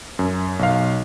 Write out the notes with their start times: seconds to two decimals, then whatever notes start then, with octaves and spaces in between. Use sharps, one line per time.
0.19 F#2
0.59 B1 F5